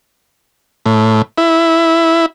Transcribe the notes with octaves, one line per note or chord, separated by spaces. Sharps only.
A2
E4